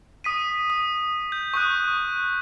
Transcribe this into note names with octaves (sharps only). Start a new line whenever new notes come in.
D#6 B6 D#7
D#6
G6
C#6 D#6 F#6